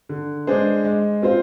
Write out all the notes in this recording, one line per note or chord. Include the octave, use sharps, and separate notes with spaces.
D3
G#3 D4 G#4 C5
G#3
C4 F4 C5